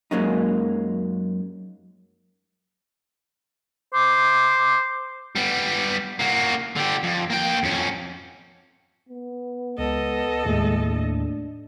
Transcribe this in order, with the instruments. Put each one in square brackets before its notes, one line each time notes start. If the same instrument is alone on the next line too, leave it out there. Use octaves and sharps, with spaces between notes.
[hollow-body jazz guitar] F#2 F#3 G#3 A#3 C#4 D#4
[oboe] C5 [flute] D6
[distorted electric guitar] G3 B3
A#3 F#4
D3 G4
F2
A#3 G5
F2 C#4
[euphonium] B3
[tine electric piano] C#2 [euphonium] B3 [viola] A4 D#5
[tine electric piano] D#2 A2 A3 [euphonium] G#3
[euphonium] D4